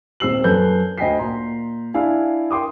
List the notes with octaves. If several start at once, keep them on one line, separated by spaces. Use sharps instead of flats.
D#1 C4 E6 C7 F#7
F#2 A4 B4 G6
D2 D#5 G5 G#5 B6 C7
A#2 A#5 C6
D4 E4 F5 G#5
A#4 G5 C6 D6 D#6